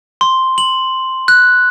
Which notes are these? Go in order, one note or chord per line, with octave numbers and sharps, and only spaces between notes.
C6
F#7
F#6